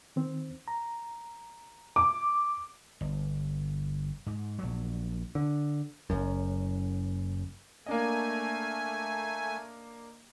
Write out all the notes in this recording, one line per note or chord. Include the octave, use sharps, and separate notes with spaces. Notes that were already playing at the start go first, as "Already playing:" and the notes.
D#3 C4
A#5
D6
G1
G#2
A#1 F#3
D3
F#1 F#2
A3 A#3 D4 D#5 G#5